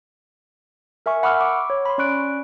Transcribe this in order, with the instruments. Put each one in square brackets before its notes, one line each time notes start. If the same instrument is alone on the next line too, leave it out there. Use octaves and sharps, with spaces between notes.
[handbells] A#4 E5 G#5 C#6
F#5 B5 C#6 D6 E6 F6
C#6 D6
C#5
B5 C6
C#4 D5 C#6 F#6 D7